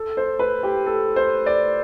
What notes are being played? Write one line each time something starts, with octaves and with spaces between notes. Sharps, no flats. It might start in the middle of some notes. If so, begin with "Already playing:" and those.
Already playing: A4
C5
B4
G4
A4
C5
D5